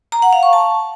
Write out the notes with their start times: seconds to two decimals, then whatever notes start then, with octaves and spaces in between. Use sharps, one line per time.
0.12 A#5
0.22 F#5
0.33 F5
0.43 C#6
0.53 A5